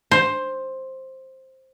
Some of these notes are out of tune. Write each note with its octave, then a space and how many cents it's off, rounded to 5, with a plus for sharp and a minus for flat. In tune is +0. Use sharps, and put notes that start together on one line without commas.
C5 +10